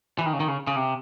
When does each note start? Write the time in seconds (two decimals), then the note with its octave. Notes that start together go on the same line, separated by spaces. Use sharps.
0.19 E3
0.26 D#3
0.33 C#3
0.40 D#3
0.48 C#3
0.67 C#3
0.76 C3